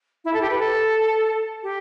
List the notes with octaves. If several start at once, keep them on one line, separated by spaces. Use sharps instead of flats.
E4
A4
G4
B4
A4
G4